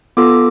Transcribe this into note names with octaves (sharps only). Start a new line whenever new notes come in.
B3 F4 A4 D6